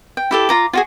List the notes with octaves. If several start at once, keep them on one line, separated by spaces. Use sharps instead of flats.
G5
E4 G4 A4
F4 A#5 D6
F4 F#4 G#4